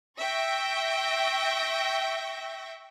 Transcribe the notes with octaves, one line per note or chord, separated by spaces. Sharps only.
E5 G5 C#6 A#6